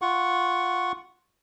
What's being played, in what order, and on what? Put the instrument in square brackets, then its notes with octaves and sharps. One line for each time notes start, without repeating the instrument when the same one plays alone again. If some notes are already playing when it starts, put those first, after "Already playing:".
[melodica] F4 F#5 C#6